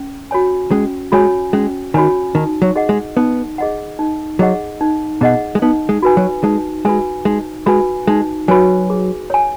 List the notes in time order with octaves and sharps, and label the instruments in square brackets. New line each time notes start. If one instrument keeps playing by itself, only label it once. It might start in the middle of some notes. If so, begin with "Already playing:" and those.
Already playing: [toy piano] C#4
F#4 C#5 G#5
[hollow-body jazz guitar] G#3 [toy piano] C#4
[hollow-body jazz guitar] G#3 [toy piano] F#4 C#5 G#5
[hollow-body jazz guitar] G#3 [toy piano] C#4
[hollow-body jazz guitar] D#3 [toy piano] F#4 C#5 G#5
[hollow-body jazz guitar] D#3 [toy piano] D#4
[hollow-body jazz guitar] F#3
[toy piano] G#4 D#5 F#5
[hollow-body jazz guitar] G#3
[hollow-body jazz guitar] B3 [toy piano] D#4
[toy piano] G#4 D#5 F#5
D#4
[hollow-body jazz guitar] F#3 [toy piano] G#4 D#5 F#5
[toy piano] D#4
[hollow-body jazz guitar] B2 [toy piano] G#4 D#5 F#5
[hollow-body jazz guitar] G#3
[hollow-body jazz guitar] B3 [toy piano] D#4
[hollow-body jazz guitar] G#3
[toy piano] F#4 B4 G#5
[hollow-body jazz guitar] F#3
[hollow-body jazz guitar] G#3 [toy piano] D#4
[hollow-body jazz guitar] G#3 [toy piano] F#4 B4 G#5
[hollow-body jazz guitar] G#3 [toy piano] D#4
[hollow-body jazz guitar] G#3 [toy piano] F#4 B4 G#5
[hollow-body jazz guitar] G#3 [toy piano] D#4
[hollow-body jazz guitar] F#3 [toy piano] F#4 B4 G#5
[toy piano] G#4
C#5 G#5